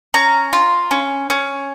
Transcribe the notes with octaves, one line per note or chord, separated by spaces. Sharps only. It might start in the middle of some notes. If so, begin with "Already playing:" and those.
C#4 A#5
F4
C#4
C#4